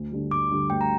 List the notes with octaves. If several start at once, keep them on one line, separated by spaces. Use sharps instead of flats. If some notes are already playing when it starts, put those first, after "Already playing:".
Already playing: D2
D3 G3
D2 D6
D3 G3
D2 G5
A#5